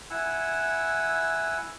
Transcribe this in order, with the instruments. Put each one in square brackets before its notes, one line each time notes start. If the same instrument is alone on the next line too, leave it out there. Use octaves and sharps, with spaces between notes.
[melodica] E4 F#5 G#5 E6